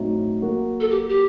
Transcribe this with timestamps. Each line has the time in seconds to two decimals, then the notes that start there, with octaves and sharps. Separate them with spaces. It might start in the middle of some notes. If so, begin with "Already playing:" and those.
Already playing: A2 F#3 A3 C4 D#4
0.42 F#3 A#3 F#4
0.80 A4
0.90 G4
1.10 G4